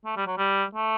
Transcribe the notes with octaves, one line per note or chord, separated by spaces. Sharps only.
A3
G3
F#3
G3
A3